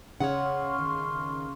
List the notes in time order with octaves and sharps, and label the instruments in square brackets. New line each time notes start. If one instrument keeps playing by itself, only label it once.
[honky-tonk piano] C#3 [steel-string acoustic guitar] C#5 F#5 [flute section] C6 C#6 F6
[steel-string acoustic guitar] D#3